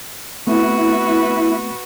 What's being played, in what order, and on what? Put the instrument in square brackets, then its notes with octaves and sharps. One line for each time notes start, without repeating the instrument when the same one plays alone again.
[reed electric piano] A3 B3 C4 [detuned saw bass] E4 [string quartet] F#4 B4